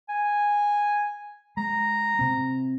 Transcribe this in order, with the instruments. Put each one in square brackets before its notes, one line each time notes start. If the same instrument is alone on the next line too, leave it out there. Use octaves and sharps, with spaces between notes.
[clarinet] G#5
[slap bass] G#3 [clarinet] A#5
[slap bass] C3 C4